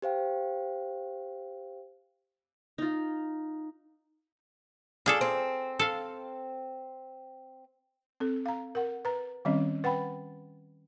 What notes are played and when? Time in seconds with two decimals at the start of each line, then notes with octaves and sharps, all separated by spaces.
0.02 G4 C5 F5 G5
2.78 D#4 F4
5.06 D4 F4 G#4 A4
5.21 C4
5.79 A4 F5
8.20 C4 A4
8.46 F5 A#5
8.75 A#4 F#5
9.05 B4 A#5
9.45 D#3 G3 C4 C#4 D#5
9.84 B4 F#5 G5 B5